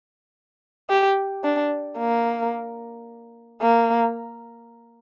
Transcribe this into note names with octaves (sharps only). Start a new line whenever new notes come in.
G4
D4
A#3
A#3